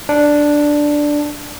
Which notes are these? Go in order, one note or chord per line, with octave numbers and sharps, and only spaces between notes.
D4